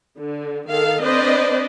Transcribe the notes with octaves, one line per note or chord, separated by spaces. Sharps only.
D3
D#3 A4 F5
C4 D4 B4 C5 D5 D#5